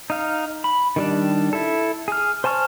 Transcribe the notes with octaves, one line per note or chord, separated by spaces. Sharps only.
D#4 F5
B5
D#3 G3 D4
E4 A4
G#4 F6
C5 G#5 A5 C#6 F6